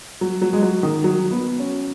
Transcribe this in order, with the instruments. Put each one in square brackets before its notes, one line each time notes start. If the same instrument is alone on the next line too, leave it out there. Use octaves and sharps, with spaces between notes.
[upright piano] F#3
F#3
G#3
F#3
D#3
F#3
B3
C#4